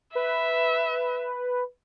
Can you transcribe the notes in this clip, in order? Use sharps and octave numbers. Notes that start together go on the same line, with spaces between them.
B4 E5